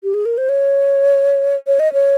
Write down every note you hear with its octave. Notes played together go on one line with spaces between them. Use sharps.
G4
G#4
A#4
C5
C#5
C#5
D#5
C#5